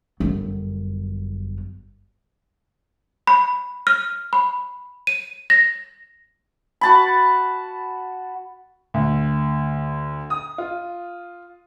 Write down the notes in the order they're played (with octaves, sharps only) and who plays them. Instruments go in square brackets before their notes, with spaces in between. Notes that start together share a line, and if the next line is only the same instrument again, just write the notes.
[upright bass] G1 F#2
[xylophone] B5
F6
B5
D#7
A#6
[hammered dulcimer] F#4 A5 B5
[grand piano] D2
D#6
F4